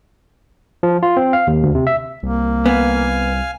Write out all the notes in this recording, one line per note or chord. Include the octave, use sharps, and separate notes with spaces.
F3
F4
C4
F5
D#2
D2
C3
E5
C2 A#3
B3 F5 G#5